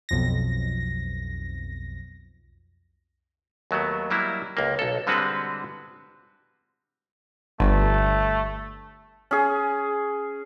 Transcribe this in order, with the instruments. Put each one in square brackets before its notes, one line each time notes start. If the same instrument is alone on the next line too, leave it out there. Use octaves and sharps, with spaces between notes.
[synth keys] B1 F2 A#6
[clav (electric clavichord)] D#2 F#3 A3 B3
F#3 G3 A#3 E4
C#2 A#3
B1 A4
D3 G3 G#3 C4 F#4 B4
[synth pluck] G1 [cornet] A3
[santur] C#4 G#4